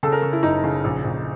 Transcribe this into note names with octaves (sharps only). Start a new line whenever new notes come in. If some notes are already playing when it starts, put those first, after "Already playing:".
C#3 A4
A#4
C#3
E4
F#1 D#4
C#3
A#1
A#1